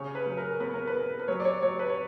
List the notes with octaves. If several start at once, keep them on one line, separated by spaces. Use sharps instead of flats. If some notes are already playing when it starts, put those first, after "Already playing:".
Already playing: C#3 C#4 C#5
B4
F#3
A#4
B3 B4
A#4
B4
B3
B4
F#3 C#5
D5
C#5
F#3 C#5
B4
C#5